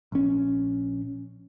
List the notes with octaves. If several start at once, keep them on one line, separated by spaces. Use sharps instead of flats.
A#1 C#4